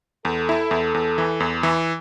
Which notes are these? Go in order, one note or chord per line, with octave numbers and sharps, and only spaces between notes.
E2 A4
E4
E2
E2
E3
E2
E3